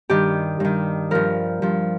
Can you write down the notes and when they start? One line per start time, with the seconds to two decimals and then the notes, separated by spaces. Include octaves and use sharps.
0.09 G2 D#3 G4
0.60 G2 D#3
1.11 G2 F3 A#4
1.62 G2 F3